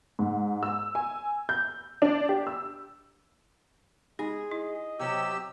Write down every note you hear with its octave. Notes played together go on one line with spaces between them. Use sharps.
G#2
E6
G#5
G6
D4
G4
E6
G#3 D#4 G#4
E4 D#5
C3 F#3 C4 G4 E6